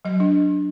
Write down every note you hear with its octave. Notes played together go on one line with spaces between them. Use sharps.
F#3 D#5
D4